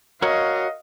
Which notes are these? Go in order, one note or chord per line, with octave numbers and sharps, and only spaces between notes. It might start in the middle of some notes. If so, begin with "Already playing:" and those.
F#4 A#4 C#5 D#5 F5